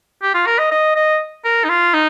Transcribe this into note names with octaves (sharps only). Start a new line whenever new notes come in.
G4
F4
A#4
D#5
D#5
D#5
A#4
D#4
F4
D#4